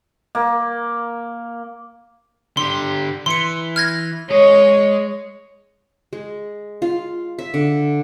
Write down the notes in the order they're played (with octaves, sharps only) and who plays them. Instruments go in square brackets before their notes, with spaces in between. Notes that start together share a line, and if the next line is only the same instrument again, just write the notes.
[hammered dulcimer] A#3
[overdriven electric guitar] D3 G4 [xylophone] C6
[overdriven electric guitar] E3 [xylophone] C6 C#7
[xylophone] F6 G#6 A#6
[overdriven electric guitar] G#3 D#5 [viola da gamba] C#5
[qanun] G#3
F4
E5
D3